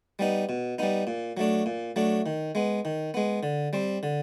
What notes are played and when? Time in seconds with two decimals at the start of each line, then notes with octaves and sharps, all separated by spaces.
0.19 G3 B3 D#4
0.49 B2
0.79 G3 B3 D#4
1.07 A#2
1.37 F#3 A3 D4
1.66 A#2
1.96 F#3 A3 D4
2.26 D#3
2.55 G#3 B3
2.85 D#3
3.14 G#3 B3
3.43 D3
3.73 G3 C4
4.03 D3